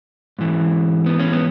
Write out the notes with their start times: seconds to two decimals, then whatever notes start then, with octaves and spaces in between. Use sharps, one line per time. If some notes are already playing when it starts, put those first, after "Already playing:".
0.39 G#2 E3
1.06 B3
1.19 C#4
1.33 B3